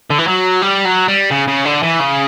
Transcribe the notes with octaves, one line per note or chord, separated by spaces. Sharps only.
D3
E3
F#3
G3
F#3
G3
C#3
C#3
D3
E3
C#3